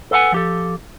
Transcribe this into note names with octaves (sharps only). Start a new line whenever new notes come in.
A4 B4 F5 F#5 G#5
F3 G4 A4